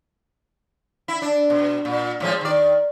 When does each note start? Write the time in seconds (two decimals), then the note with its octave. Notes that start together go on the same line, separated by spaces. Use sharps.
1.08 E4
1.22 D4
1.50 B2
1.85 A#2
2.20 A2 F3 G#3
2.41 D#3 D5